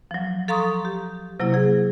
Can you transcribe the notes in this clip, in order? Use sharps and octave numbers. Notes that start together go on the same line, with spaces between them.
F3 F#3
A4 F5 A#5 C6 C#6 D#6
G4
C3 F#3 A#3 E4
F#3 G#4